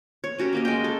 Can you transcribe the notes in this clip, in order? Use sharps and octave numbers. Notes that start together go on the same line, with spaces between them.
C#5
C#4 F#4 G4 A#4
A#3 G4 D#5
G#3 G5
A4